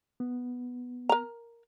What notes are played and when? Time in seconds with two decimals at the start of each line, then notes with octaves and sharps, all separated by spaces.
0.20 B3
1.09 A#4 A#5